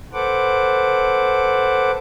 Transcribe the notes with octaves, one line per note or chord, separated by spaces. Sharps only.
A4 B4 C5 F#5 D6